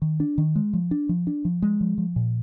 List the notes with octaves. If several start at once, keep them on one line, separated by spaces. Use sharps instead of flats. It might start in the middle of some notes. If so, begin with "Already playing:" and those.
D#3
D4
D#3
G#3
F3
D4
F3
D4
F3
G#3
F3
F3
A#2